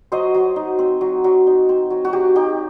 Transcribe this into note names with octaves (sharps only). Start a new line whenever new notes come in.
F#3 C5 D#5
F#3
D#4
C4
F#3
F#3
D#4
C4
F#3
F#4
F#3 G4
D#4 G4